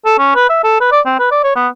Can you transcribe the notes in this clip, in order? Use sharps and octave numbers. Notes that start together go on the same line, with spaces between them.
A4
C#4
B4
E5
A4
B4
D5
C4
B4
D5
C#5
B3